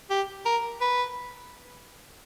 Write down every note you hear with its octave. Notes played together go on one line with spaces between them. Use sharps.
G4
A#4
B4